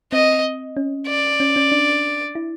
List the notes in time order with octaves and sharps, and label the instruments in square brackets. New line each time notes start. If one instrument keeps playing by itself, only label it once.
[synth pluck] C4 [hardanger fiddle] D#5
[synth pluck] C#4
[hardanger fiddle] D5
[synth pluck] C#4
C#4
D4
E4